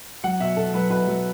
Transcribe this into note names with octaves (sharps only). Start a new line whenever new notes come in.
F#3 F#5
B2 E5
B2 A4
F#3 B4
B2 B4
F#3